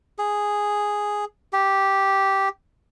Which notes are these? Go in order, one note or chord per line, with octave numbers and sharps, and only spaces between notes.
G#4
G4